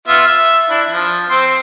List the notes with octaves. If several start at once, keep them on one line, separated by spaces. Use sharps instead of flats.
B3 F4 E5
E5
D4 E4
F3
C4 C6